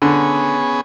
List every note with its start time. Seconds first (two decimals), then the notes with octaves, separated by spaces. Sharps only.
0.02 D3 B3 C#4 G#4